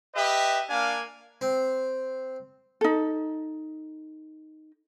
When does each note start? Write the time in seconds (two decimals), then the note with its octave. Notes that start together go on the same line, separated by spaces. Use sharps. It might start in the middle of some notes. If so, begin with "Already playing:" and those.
0.15 G4 B4 D#5 E5
0.69 A#3 D4 F5 G#5
1.41 C4
2.81 D#4 A4